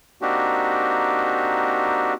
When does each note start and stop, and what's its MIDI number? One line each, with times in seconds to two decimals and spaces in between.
0.22 2.14 58
0.22 2.14 60
0.22 2.14 62
0.22 2.14 63
0.22 2.14 66
0.22 2.14 67